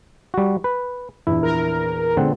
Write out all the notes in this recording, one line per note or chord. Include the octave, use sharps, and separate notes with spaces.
G3 F#4
B4
A#1 E2 E4
A#4
A#2 D3 G#3 B3 C4 F#5